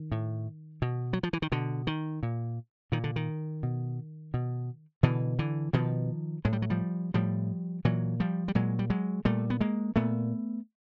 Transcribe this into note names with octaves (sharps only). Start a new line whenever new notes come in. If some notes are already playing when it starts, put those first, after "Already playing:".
Already playing: D#3
A2
B2
F#3
F3
E3
D#3
B2 D3
D#3
A#2
A#2 D#3
D3
D#3
B2
B2
B2 D3 E3
D3 E3
B2 D#3 F3
A2 G#3
G3
F#3
F3 G3
A2 F3 G3
A#2 E3 F#3
F3 G3
G3
A#2 F#3 G#3
G3
F#3 G#3
A#2 G3 A3
B3
G#3 A#3
A#2 A3 B3